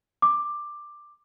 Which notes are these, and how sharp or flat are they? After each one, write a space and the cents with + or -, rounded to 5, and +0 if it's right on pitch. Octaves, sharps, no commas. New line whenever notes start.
D6 +10